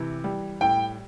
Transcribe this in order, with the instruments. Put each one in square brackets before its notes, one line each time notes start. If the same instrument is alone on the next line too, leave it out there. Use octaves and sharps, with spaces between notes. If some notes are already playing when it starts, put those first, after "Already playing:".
Already playing: [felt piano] C3 E3
G3
[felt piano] A2 [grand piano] G5